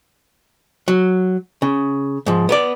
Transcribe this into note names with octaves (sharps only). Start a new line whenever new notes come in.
F#3
C#3
G#2 F3
B3 A#4 D5